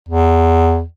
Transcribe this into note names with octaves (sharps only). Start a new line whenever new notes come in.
E2